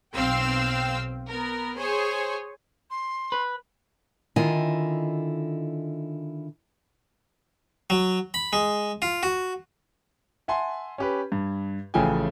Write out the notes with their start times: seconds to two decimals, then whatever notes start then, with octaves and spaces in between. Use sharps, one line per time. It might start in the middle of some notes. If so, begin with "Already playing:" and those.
0.15 B1 C4 F5 G5 E6
1.26 B3 A#4
1.77 G#4 C5 C#5 G#5 C#6
2.91 C6
3.32 B4
4.36 D3 D#3 E4 F4 D#5 G#5
7.90 F#3
8.34 B5
8.53 G#3
9.02 F4
9.23 F#4
10.48 E5 F#5 G#5 A5 C6
10.98 C#4 G4 B4
11.32 G2
11.94 A1 C#3 F3 A3 G5 G#5